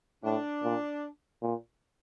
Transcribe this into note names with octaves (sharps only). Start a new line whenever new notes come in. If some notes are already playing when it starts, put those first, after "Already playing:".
A2 D4
A#2
A#2